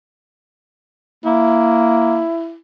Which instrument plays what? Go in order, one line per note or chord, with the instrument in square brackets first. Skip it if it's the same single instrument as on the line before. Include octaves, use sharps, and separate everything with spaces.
[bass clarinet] A#3 [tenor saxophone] E4